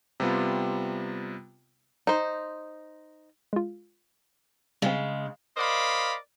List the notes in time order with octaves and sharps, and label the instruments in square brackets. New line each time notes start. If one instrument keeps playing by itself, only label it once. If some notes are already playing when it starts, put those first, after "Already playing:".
[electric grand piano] C3 G3 B3 F4
[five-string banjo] D#4 C5
[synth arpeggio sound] G#3 F4
[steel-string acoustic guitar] C#3 G#3 [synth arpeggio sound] G3 C4
[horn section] A#4 C5 D5 D#5 F5 B5